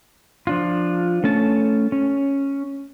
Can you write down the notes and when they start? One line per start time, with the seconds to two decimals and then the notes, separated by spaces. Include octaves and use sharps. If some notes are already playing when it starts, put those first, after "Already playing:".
0.47 F3 D4 F4
1.24 A3 C#4 A5
1.92 C#4